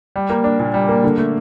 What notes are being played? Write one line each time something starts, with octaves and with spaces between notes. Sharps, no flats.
G3
A#3
D4
A#2
G3
A#3
D3
A3